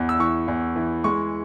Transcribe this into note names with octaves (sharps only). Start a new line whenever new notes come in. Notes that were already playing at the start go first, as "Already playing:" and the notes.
Already playing: E2
E6
E3 C#6
E2
E3
G#3 C#6